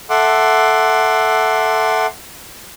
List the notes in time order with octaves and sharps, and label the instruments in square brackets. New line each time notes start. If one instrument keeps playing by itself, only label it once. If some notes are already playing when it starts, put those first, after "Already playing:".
[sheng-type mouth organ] A4 E5 F#5 C6 D6